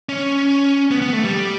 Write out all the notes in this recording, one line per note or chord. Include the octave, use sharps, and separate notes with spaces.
C#4
B3
B3
A3
G3